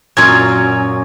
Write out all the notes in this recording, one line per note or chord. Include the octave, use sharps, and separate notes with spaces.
F#2 A#2 F4 C#5